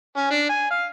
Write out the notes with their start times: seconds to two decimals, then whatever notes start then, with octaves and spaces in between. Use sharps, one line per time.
0.16 C#4
0.30 D4
0.49 G#5
0.70 F5